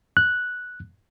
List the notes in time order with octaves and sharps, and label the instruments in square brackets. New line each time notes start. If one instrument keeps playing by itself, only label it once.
[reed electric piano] F#6